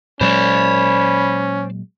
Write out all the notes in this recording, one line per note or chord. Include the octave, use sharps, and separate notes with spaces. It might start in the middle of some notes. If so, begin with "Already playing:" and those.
A#2 F#3 G#3 C#4 C5 D5 B5